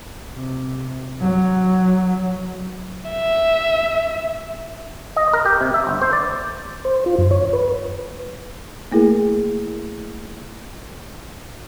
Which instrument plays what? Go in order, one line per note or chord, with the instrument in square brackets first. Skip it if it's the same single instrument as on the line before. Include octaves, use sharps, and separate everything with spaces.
[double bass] C3
F#3
[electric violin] E5
[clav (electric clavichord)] D#5
A#4
G4
C3
E5
G1
C5
D5
[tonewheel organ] C5
F4
F#2
C#5
B4
[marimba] A3 A#3 E4 G#4 A#4